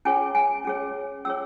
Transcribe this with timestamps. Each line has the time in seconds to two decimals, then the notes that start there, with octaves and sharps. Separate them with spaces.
0.05 C#4 G#4 C#5 G#5
0.35 G#5
0.65 C#4 G#4 C#5
1.25 C#4 G#4 C#5 E6